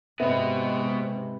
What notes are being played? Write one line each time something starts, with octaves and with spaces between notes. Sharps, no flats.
G#2 C3 G#3 B3 C4 B4 D#5 E5